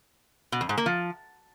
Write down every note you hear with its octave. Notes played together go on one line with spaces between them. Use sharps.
B2
F2
G#2
A#3
F3